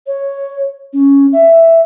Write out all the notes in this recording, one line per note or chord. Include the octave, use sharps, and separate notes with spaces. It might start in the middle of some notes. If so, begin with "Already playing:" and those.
C#5
C#4
E5